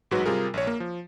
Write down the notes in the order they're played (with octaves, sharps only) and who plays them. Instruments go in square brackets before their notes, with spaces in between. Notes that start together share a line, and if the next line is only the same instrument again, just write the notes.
[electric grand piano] A1 G#2 F#3 F#4 B4
C3 G3 F4 G#4 A#4
A#1 C#5
A#3
F3